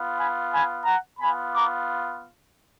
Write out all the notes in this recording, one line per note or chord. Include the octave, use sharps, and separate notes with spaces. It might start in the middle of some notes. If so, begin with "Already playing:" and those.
Already playing: B3 F4
G#5 B5
G#5 B5
F#5 A#5
B3 F4 G#5 B5
A#5 D6